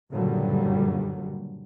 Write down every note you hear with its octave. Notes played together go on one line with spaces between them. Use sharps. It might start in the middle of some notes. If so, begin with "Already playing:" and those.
F#1 G2 A#2 D3 F#3 G3